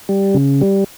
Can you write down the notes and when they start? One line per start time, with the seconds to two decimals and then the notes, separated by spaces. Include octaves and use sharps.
0.09 G3
0.34 C#3
0.61 G3